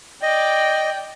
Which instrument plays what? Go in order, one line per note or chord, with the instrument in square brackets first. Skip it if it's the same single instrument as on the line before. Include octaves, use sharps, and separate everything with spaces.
[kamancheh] D5 G5 [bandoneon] D#5